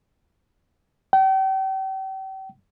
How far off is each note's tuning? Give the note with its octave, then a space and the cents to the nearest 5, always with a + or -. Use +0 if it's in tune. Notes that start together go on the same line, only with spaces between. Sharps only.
G5 -40